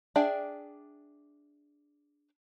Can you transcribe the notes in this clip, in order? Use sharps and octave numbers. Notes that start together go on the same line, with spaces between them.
D4 G#4 D5 E5 G5